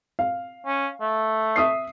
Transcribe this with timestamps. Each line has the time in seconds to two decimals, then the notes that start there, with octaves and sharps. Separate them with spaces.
0.19 F5
0.66 C#4
1.01 A3
1.56 E5 D#6 C7